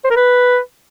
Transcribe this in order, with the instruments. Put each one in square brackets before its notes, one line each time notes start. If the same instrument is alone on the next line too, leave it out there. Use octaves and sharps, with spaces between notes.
[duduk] C5
A#4
B4